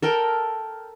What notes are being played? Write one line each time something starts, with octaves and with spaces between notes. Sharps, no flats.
A4 A#4 G5